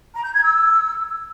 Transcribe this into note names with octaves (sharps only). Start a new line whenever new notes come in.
A#5
G6
G#6
E6